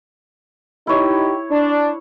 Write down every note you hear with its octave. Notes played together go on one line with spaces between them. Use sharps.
D#4 E4 G4 C#5
D4